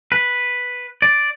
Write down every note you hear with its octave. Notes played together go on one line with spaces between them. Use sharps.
B4
D5